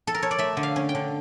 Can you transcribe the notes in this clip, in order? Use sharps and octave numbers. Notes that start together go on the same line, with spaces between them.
A4
A#4
C#5
D5
A3 E5
D3
F5
C#4
G5
D3